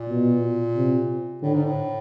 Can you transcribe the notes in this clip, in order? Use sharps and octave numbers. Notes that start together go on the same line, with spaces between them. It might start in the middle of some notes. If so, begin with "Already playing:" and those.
Already playing: A#2
B2
C3
A2 D3
G#2
A2